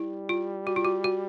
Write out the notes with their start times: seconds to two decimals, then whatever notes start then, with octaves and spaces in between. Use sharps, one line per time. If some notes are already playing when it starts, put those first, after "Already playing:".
Already playing: G3 E4
0.29 F4
0.67 F#4
0.76 F4
0.85 F#4
1.04 F#4